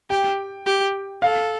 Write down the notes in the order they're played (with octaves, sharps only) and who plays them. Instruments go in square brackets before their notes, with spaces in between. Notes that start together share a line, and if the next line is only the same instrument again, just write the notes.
[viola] G4 [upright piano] G5
[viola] G4
[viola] A4 [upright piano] F5